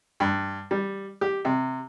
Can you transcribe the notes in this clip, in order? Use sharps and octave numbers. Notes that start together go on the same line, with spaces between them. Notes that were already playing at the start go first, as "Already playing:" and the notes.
G2
G3
G4
C3